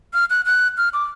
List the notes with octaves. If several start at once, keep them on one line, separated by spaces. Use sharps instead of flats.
F6
F#6
F#6
F6
D6